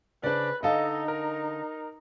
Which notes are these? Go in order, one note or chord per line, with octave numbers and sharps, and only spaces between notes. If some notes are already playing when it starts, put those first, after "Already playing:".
C#3 D4 B4 C5 D5
D3 D#4 A4 D#5 F5 A5
A#4